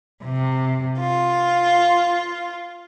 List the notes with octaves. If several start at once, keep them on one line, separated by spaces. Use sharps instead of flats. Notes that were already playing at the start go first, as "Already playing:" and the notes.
C3
F4